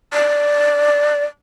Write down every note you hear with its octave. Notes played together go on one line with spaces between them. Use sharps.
D5